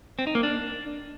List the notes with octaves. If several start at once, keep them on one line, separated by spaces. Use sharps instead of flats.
C4
D#4
A#3
D4